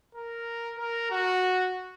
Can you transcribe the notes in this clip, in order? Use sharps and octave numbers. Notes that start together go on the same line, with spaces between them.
A#4
A#4
F#4